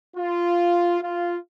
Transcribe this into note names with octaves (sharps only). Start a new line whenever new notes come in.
F4
F4